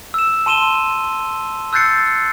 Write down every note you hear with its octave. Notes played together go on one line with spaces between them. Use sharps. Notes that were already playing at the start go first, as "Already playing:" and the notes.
E6 E7
A5 C6 D#7 E7 G7
E6 F#6 G6 A6 C7 C#7